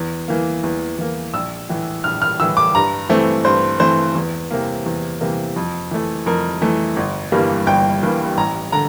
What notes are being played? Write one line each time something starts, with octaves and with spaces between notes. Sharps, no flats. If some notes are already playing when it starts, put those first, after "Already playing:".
Already playing: E2
E3 A#3
E2
E3 A#3
A#1 E6
A2 E3
A#1 F6
F6
A2 E3 E6
D6
G2 A#5
E3 A3 C4
G2 C5
E3 A3 C4 C5
E2
C3 E3 A#3
E2
C3 E3 A#3
F2
E3 A3
F2 A#4
E3 A3
G1
G2 E3 G3 A#3
G1 G5
G2 E3 G3 A#3
A1 A#5
D3 A#5